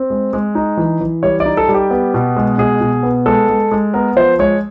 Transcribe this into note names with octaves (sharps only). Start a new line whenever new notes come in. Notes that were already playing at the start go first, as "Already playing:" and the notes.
Already playing: C4
G#3
G#3
D#4
E3
E3
G3 C#5
D5
D#4
A4
G3
G4
B3
B2
G#3
B2 G#4
B2
B3
G#3 A4
G#3
G#3
B3 A#4
F3 C5
G#3 C#5